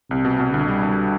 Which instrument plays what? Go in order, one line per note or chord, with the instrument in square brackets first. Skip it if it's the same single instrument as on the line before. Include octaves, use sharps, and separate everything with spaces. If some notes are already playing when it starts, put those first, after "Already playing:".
[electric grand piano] C2 [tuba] C3
[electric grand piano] B2
B2
[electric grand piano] C2 [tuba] D3
[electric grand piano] G3
C2